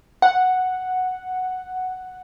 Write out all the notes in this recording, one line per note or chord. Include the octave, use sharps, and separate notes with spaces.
F#5